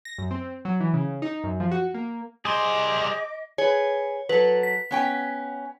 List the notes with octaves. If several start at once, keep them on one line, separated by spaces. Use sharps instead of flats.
A#6
F#2
C4
F#3
E3
C#3
D#4
F#2
F3
F#4
A#3
G3 G#4 C5 D#5 C6 D6
G#4 B4 C#5
F#3 A4 B4
B6
B3 C#4 G5